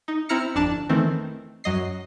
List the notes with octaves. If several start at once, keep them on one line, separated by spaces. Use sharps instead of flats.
D#4
C4 E4 A#5 F6 A#6 C#7
G1 F2 D4 A5
D#3 E3 A3 C4
F#2 F#3 D#5 C7